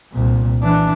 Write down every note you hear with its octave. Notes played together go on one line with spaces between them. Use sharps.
C2 A#2
E3 D4